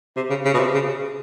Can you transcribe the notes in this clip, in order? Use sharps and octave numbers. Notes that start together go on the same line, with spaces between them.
C3
C#3
C#3
B2
C3
C#3